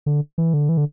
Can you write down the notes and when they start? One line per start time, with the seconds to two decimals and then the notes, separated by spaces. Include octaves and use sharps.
0.06 D3
0.38 E3
0.54 D3
0.69 E3
0.77 D3